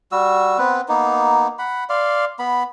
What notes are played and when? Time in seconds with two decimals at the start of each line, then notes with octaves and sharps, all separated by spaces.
0.12 G3 F#4 E6
0.58 B3 C4 B4
0.88 A#3 B3 D#4
1.59 F#5 B5
1.89 D5 F5 C6
2.39 B3 B5